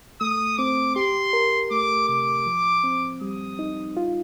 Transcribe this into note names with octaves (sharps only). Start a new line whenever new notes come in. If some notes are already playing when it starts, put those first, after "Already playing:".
A3 D#6
C4 D6
G4 C6
A#4
A3 D6
C3 D6
F3
C4
G3 D#6
D#4
F4